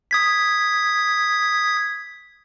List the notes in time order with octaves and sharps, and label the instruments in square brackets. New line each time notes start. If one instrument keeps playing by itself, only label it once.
[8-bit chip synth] D#6 G#6 B6